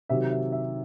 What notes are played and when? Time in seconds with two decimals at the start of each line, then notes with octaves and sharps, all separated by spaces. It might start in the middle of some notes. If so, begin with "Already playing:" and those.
0.09 C3 D#3 F#3 E5
0.31 E5
0.52 E5